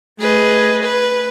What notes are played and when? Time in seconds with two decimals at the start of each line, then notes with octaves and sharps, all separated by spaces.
0.18 A3 G#4 B4 D#5
0.84 B4